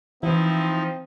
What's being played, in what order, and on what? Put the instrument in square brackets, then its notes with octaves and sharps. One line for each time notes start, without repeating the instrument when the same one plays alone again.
[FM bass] E3 [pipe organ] F3 D#4 [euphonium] C4 [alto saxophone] E4